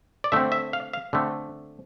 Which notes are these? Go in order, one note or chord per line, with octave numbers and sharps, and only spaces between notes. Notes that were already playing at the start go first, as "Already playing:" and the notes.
D5
D3 A3 C4 E5
E5
F5
F5
D3 A3 C4